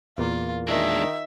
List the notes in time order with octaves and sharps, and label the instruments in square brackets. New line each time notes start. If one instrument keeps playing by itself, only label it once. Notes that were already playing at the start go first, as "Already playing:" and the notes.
[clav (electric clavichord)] E2 A#2 A#3 [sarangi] F4
[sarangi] D#3 [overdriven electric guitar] G#3 D4 [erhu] E5